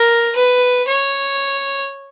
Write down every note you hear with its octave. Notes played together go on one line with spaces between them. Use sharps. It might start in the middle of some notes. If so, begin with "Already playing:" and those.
Already playing: A#4
B4
C#5